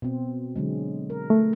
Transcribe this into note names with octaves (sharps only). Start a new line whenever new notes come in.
B2 C4
D3 F#3 G#3
A#4
A3